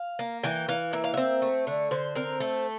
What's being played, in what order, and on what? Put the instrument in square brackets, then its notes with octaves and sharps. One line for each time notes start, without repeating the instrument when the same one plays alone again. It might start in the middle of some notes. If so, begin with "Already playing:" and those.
Already playing: [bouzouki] F5
A#3
E3 G5
E3 F5
A#3 E5
F5
C4 E5
A3
D3
D3 C5
C4 A#4
A3 A4